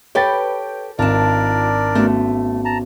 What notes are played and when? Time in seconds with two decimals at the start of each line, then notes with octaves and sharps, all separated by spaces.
0.15 G4 A4 B4 C#5 G5 A6
0.99 G#1 D4 F4 A#4 D5 A5
1.95 A3 B3 C#4 F#4
2.65 A5 A#5